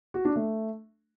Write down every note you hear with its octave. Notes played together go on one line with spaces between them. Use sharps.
F#4
D4
A3